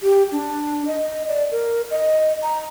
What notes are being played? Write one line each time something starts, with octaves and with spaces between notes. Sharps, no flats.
G4
D4
D#5
D5
A#4
D#5
A#5